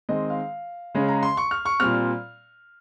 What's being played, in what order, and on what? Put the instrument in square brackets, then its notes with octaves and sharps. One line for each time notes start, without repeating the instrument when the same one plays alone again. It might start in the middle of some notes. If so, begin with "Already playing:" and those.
[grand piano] D#3 G#3 C4 D#5
F5
C#3 G#3 C#4
A#5
C6
C#6
F6
C#6
A#2 G3 C4 F6